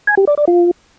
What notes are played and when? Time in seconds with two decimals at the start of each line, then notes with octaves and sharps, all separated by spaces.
0.07 G#5
0.17 G4
0.27 D5
0.37 D5
0.48 F4